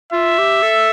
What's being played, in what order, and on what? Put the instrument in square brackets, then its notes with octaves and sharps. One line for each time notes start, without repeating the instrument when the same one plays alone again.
[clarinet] F4 [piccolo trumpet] E5
[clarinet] G4
A4